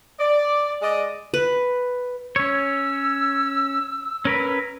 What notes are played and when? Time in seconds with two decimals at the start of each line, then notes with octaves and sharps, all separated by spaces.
0.19 D5
0.82 G#3 D5 D#5
1.34 B4
2.36 C#4 C#5 E6
4.25 C#4 A#4 B4